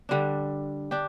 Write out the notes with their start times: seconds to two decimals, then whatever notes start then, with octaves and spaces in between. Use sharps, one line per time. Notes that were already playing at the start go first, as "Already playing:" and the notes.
0.09 D3 G3 D4
0.91 D4 G4